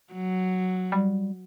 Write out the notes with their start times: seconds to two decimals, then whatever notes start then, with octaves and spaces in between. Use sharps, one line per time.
0.13 F#3
0.92 G3